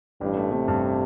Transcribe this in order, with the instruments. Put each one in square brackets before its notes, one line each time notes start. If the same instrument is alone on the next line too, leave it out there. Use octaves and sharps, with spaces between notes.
[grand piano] A1 [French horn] G2
[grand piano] A3
[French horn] C3 [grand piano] A3
[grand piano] G2